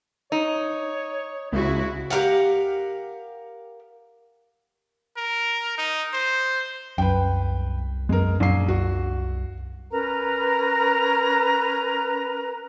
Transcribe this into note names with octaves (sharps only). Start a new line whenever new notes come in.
D#4 C#5
C#2 C#3 G#3 E4 F#4
G4 A#4 F5 F#5
A#4
D#4
C5
C2 F#2 B4 G5
F#2 G#3 A#4
A#1 F#2 C7
C2 F#4
C#4 A#4 B4 A#5